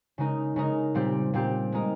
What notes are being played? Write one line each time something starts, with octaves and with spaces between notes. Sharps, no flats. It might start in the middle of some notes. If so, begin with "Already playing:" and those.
C#3 G#3 D#4 A#4
C#3 G#3 D#4 A#4
A#2 G3 C4 G4
A#2 G3 C4 G4
G#3 D#4 A#4